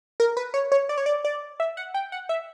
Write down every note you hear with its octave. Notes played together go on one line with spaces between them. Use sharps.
A#4
B4
C#5
C#5
D5
C#5
D5
D5
E5
F#5
G5
F#5
E5